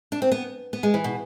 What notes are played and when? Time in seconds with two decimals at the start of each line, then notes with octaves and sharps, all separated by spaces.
0.12 D4
0.22 C4
0.32 B3
0.73 B3
0.83 G#3
0.94 E3
1.04 B2